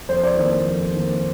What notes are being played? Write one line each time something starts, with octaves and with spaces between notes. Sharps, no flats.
F2 C5
D5
D#3 A#3 C5
F2
D#3 A#3